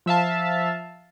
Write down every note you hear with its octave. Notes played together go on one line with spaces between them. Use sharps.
F3 E5 F5 A5